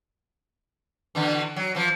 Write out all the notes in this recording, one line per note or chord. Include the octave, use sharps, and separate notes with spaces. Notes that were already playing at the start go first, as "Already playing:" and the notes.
B2 D3 E3
F#3
E3 F3